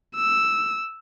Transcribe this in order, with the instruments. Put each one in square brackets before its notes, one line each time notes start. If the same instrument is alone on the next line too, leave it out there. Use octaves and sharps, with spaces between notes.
[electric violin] E6